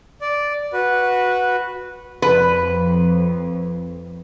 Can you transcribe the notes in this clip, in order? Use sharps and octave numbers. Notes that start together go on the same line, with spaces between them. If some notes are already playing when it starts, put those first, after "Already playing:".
D5
F#4 B4
F2 B4